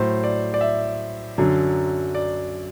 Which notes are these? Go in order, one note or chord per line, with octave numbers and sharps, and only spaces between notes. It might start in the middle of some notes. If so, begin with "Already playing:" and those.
Already playing: A2 F#3 C5
D5
D5
E5
F#2 D3 F#3
D5